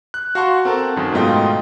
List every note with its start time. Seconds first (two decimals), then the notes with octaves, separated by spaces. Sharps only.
0.14 F#6
0.35 F#4 F5 F#5 A5 C6 C#6
0.65 C4 A4 A#4 A5
0.96 F#2 D#3
1.12 G#2 B2 A3 F4 D#5 G5